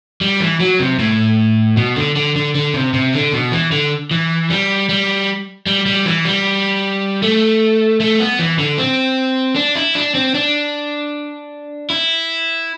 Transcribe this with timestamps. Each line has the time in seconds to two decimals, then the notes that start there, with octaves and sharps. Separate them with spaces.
0.21 G3
0.40 E3
0.60 F#3
0.79 C3
0.99 A2
1.77 B2
1.96 D3
2.15 D3
2.35 D3
2.55 D3
2.74 C3
2.94 C3
3.13 D3
3.32 B2
3.52 E3
3.72 D3
4.11 E3
4.50 G3
4.89 G3
5.66 G3
5.86 G3
6.06 E3
6.25 G3
7.22 A3
8.00 A3
8.20 B3
8.39 E3
8.59 D3
8.78 C4
9.56 D4
9.76 E4
9.95 D4
10.15 C4
10.34 D4
11.90 E4